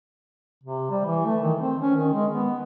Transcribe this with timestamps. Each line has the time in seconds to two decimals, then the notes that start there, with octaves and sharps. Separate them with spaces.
0.63 C3
0.91 G3
1.05 E3
1.25 A3
1.43 D#3
1.59 C4
1.81 C#4
1.96 D#3
2.13 G#3
2.31 B3